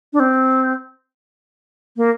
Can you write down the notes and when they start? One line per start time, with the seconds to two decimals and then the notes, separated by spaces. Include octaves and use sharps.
0.13 D4
0.20 C4
1.97 A#3